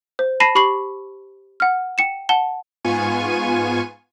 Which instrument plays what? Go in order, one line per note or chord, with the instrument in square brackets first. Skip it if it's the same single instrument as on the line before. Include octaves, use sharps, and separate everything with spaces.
[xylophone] C5
A5 B5 A#6 C7 D#7 E7
G4 B5 C#6 C7 F#7
F#5 F6
G5 C#7 E7
F#5 A5 G7
[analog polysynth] G#2 B3 F4 G#5 C#6 D#7